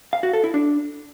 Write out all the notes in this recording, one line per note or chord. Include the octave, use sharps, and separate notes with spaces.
F5
F#4
A4
E4
D4